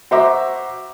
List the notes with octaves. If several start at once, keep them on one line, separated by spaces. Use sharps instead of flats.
F#4 C5 E5 A#5 D6